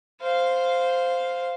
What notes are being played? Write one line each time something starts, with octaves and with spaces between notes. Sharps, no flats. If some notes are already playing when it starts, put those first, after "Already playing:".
C5 F5